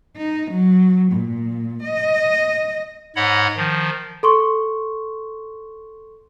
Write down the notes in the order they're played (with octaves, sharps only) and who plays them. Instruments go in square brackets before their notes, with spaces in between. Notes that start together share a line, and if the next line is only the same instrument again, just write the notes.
[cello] D#4
F#3
A#2
D#5
[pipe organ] G#2 C#5 D#5 F#5 B5
D#3 F3
[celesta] A4 C6 C#6